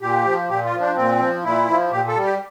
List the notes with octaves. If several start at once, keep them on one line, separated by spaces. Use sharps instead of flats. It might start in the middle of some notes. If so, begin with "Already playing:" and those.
A#2 G4
F3
A#2 G4
F4
F3
D4
A#2 C4
F3
A#2 E4
F3
A#2 G4
A4
G3
G4